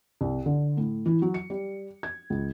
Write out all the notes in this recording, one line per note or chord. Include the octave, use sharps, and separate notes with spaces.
C2
D3
A2
E3
F#3
C#7
G3
G#6
C#2